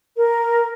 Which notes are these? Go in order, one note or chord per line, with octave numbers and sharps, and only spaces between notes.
A#4